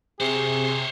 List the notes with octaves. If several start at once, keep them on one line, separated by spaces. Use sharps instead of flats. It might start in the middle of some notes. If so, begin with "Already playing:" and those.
C3 G#4 C5 C#5